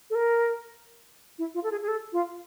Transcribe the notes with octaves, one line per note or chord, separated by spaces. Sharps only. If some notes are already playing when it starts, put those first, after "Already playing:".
A4
A#4
E4
F4
A4
G#4
G#4
A4
F4